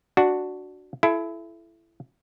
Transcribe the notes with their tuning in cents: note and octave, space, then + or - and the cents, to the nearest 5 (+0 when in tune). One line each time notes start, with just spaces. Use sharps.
D4 +0 F#4 +0
E4 +20 A4 -30